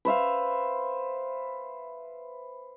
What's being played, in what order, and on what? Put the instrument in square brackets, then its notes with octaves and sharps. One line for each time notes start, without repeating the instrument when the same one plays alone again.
[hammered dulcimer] B4 C5 E5 F5